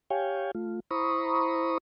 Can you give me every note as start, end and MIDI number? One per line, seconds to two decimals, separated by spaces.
0.10 0.51 67
0.10 0.51 73
0.10 0.51 77
0.10 0.51 79
0.10 0.51 80
0.55 0.80 57
0.55 0.80 65
0.91 1.78 64
0.91 1.78 72
0.91 1.78 82
0.91 1.78 83
0.91 1.78 85
0.91 1.78 87